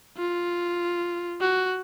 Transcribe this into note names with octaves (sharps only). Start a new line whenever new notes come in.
F4
F#4